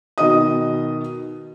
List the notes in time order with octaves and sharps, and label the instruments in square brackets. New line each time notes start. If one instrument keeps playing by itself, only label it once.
[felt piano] B2 D#3 D#5 D#6